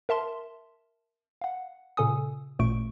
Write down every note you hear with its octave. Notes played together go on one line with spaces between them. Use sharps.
A#4 E5 A5 C6
F5 F#5
A#2 C#3 A4 G#5 D#6
A1 A#2 A3 C#6 D7